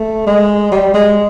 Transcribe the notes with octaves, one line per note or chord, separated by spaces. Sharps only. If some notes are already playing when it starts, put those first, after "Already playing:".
Already playing: A3
G#3
G3
G#3